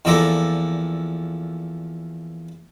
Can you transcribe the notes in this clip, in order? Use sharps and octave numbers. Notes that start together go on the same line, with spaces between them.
E2 A#2 F3 A4 D5 A#5